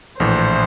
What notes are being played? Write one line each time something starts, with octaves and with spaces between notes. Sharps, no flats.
A#1 A2 E3 C5